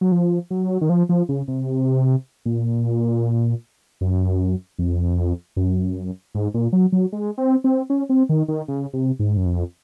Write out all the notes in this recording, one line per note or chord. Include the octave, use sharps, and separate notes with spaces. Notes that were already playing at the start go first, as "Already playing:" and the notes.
F#3
F3
F#3
D#3
F3
F3
C#3
C3
A#2
F#2
F2
F#2
G#2
A#2
F#3
F#3
G#3
C4
C4
C#4
C4
D#3
D#3
C#3
C3
G#2
F#2
F2